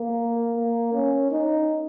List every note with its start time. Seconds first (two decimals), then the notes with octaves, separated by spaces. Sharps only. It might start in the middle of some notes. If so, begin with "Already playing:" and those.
Already playing: A#3
0.56 A#3
0.94 C#4
1.32 D#4